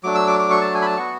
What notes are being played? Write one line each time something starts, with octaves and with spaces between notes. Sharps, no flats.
F#3 A3 D4 D6
E6
D6
D6
C#6
A5
G#5
B5
A5
B3 F#4 C#6